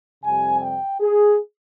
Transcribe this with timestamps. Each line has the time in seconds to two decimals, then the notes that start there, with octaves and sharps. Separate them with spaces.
0.23 F2 C3 G3 G#5
0.62 G5
1.01 G#4